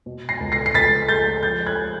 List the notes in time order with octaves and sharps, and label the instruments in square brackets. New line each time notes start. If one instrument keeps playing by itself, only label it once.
[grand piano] B2
A#6 C7
C#2
A#6 C7
C7
C#2 A6 B6
G#3 G6 A6
F3 G6 A6
F#6 G#6